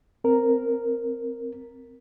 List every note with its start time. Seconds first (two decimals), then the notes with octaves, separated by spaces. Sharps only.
0.24 C4 A#4